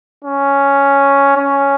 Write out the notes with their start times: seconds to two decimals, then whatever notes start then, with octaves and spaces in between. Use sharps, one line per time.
0.24 C#4
1.37 C#4